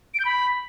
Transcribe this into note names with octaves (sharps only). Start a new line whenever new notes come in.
D7
G6
B5